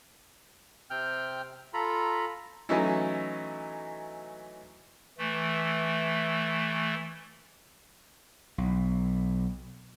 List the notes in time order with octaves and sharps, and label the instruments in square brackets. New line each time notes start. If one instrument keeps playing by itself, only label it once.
[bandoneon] C3 C4 G5 F6 G6
F4 A4 A#5 B5
[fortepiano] E3 F#3 A3 C#4 D#4 E4
[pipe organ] E3 A3
[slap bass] B1